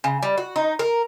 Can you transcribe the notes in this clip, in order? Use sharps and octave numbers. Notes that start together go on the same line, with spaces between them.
C#3
G3
F#4
D#4
A#4